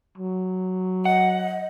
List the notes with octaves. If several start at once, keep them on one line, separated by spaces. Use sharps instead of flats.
F#3
D#5 F#5